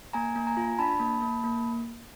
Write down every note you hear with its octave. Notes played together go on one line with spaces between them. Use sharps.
A#3 G#5 A#5
A#3
G#5 A#5
F4
D4 A5 B5
A#3
A#3
A#3